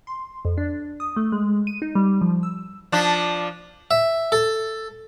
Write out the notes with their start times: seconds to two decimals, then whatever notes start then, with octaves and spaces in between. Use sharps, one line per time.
0.07 C6
0.45 F2
0.58 D4
1.00 D#6
1.16 A3
1.32 G#3
1.67 D#7
1.82 D#4
1.95 G3
2.21 F3
2.43 E6
2.92 F3 D4
3.91 E5
4.32 A4